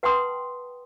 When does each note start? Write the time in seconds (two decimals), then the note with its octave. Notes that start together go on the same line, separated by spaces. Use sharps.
0.03 B4 F#5 G5 A5 C6 D#6